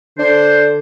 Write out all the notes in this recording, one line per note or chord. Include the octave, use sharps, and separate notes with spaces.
D3 D4 C5